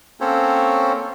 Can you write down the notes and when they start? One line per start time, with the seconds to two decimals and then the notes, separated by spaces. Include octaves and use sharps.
0.20 A#3 C4 C#4 A4 C5 C#5